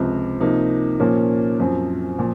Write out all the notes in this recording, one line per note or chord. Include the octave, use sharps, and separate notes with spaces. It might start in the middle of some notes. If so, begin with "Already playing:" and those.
Already playing: C#2 C3 F3 C4
C3 F3 A#3 D#4
A#2 F3 A#3 C#4
F#2 F3 C4
A#2 F3